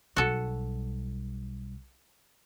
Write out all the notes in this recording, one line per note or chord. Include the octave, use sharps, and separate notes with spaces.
B1 G3 F#4 A4